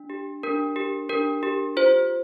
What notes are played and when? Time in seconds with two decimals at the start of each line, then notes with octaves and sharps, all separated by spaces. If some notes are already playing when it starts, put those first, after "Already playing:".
Already playing: D4
0.10 G4
0.43 D4 A#4
0.76 G4
1.09 D4 A#4
1.43 G4
1.77 F4 C5